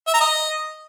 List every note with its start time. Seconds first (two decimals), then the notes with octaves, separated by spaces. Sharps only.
0.07 E5
0.14 A#5
0.21 D#5